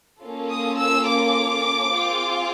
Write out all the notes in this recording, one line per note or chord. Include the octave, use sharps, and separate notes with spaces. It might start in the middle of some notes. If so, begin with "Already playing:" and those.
A#3 C#4 F4 A4
D#6
E6
D6
C4 F4 G#4